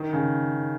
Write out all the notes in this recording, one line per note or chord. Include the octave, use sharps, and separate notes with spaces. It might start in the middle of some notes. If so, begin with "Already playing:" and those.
Already playing: D#3
C#3